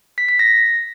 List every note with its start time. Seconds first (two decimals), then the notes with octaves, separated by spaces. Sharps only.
0.18 B6
0.29 B6
0.39 A#6